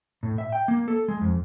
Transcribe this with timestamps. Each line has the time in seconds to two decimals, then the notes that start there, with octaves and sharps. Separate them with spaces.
0.23 A2
0.38 E5
0.52 G5
0.68 A#3
0.88 A4
1.08 G#3
1.21 F2